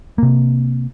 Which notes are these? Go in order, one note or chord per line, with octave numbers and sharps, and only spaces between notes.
C3 A#3